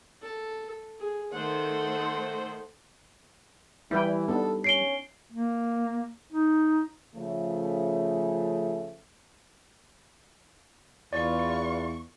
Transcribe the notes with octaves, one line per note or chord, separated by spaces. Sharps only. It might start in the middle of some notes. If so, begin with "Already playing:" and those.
A4
G#4
D#3 A3 A4 C5 F#5
E3 G3 E4 B4 G5
B3 D4 D#4 A4
C#4 C7 D7 G7
A#3
D#4
C#3 F3 A3
E2 F4 B4 D5 C#6